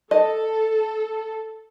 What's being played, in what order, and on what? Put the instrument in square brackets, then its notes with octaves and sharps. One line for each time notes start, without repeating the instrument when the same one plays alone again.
[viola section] A4 [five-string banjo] D#5 [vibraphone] A5